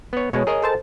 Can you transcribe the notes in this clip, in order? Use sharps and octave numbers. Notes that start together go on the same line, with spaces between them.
B3 C#5
B2 G#3 C#5
G#4 A#4 D#5
A4 C5 A5